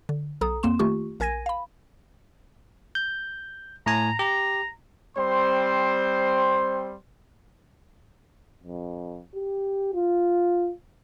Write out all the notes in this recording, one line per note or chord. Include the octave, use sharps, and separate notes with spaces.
D3
B1 A4 A#5 D#6
F2 A#3 C4 C6 E7
D#3 A3 F4 G4 C#6
A#1 A#4 G#5 G#6 A#6 D#7
F5 B5
G6
A2 G#5 A#5
G4 A#5
G3 C4 C5 C6
F2
G4
F4